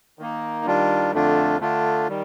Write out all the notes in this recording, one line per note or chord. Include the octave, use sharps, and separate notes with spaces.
D#3 A#3 D#4
D#3 G3 D4 F4
F2 D3 A3 D4 F4
D3 A3 D4 F4
D#3 G3